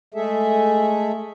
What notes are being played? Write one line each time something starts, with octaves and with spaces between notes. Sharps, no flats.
G#3 A3 G#4 A4 E5